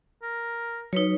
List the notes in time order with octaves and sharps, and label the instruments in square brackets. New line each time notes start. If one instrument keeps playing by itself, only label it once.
[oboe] A#4
[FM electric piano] F#3 [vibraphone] D#4 B4 C#5